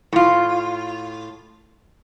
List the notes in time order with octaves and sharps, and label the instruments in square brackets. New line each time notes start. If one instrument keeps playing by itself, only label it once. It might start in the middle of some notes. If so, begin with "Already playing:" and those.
[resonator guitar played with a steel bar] A2 F4